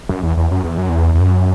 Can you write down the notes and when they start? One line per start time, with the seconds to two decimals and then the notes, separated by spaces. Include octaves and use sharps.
0.09 F#2
0.23 E2
0.37 E2
0.51 F#2
0.64 E2
0.78 F#2
0.89 E2
1.15 E2
1.20 F#2